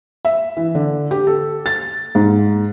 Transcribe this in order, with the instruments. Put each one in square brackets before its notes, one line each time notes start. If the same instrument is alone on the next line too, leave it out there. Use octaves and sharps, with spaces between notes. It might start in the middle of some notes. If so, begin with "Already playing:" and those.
[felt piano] E5
E3
D3
G4
A4
A6
G#2